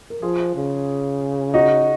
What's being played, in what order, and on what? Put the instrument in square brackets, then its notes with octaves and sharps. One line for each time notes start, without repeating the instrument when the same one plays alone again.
[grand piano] A#4
[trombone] F3 [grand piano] F4 G#4
[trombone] C#3
[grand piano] D#4 F#4